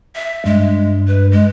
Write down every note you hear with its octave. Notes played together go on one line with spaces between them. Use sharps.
E5
G2 G#3
B4
G#3